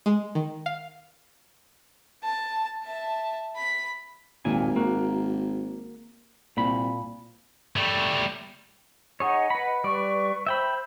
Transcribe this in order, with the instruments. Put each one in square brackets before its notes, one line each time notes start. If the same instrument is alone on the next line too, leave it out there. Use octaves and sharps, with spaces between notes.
[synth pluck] G#3
D#3
F5
[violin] A5
E5 A5
B5 B6
[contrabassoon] G#1 [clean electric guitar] D#2 A#2 G#5
[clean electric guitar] A#3 F#4
[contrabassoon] C2 [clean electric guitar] A#2 B5
[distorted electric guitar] G3 A3
[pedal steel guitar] D#4 G#4 C#5 [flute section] D#5 F#5
[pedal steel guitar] B4 B5
[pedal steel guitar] G3 D5 [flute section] B4 C#6
[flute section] C5 [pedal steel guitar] E5 G5 B5